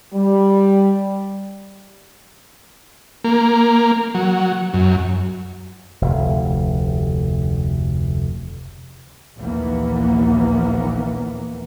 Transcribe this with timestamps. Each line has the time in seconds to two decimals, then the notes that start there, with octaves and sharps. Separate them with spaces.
0.13 G3
3.24 A#3
4.15 F#3
4.74 F#2
6.02 F1 D2
9.38 A#1 D#2 E3 A#3 B3